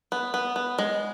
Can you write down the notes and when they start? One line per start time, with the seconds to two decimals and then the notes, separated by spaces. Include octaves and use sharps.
0.12 B3
0.34 B3
0.56 B3
0.79 G#3